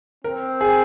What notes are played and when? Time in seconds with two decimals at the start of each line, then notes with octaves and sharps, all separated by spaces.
0.24 C4 A#4
0.61 G#4